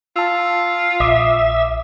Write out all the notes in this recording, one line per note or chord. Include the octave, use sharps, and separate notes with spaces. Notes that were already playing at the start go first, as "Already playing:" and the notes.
F4 A5 E6
A#1 E5 D6 D#6